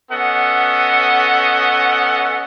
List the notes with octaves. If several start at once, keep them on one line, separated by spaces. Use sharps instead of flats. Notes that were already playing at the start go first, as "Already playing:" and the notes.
B3 C#4 A4 D#5 F#5